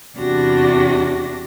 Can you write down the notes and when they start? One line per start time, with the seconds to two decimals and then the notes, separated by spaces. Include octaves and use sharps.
0.17 E2 C3 D4 F#4 G4 A#6